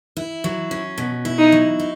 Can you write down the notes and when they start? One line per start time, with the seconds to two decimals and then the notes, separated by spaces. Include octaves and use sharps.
0.17 E4
0.44 F#3
0.71 C#4
0.98 B2
1.25 E4
1.38 D#4
1.52 F#3
1.80 D#4